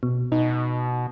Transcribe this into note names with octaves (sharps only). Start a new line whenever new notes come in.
B2
B2 D#4